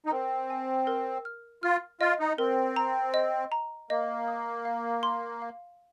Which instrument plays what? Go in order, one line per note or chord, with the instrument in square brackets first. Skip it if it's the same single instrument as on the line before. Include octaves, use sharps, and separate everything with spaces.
[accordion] D#4
[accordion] C4 [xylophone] A#4
[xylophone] G#5
A#4
F6
[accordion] F4 [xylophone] F6
[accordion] F4 [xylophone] D#5
[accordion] D#4
[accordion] C4 [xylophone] A#4
[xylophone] A#5
D#5
A#5
[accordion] A#3 [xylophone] D#5
[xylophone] D#6
F5
C6
F5